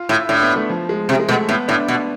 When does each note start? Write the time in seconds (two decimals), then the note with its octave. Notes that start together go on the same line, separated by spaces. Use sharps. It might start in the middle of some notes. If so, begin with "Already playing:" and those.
Already playing: F4
0.09 A2 E4
0.29 A2 D4
0.42 B3
0.56 A3
0.69 F3
0.89 G#3
1.09 C3
1.19 G#3
1.29 B2 A3
1.49 A2 B3
1.68 A2 D4
1.88 B2